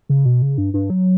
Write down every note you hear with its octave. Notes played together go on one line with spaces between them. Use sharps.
C#3
B2
C#3
G2
G2
F#3